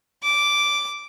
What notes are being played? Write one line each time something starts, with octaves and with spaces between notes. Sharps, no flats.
D6